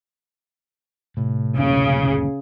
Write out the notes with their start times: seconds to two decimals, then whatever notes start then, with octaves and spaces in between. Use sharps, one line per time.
1.17 A2 C3
1.57 F#1 D2 A#2 C#3